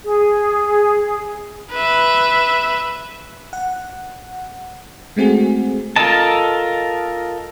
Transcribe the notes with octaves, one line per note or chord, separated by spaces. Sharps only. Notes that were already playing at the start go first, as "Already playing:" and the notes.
G#4
B4 E5
F#5
G#3 A3 C4 F#4 G#4
F4 A4 A#4 D#5 A5